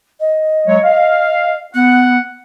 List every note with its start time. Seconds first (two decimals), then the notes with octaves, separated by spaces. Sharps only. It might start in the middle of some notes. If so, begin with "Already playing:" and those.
0.20 D#5
0.67 F#3 G#3 C#5
0.83 F5
1.74 B3 F#5